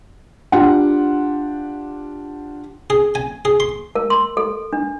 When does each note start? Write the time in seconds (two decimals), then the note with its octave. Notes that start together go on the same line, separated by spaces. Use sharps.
0.52 D4 F4 G4 F#5
2.90 G#4
3.15 G#5
3.45 G#4
3.60 C6
3.95 A#4
4.10 C6
4.37 A4
4.73 D4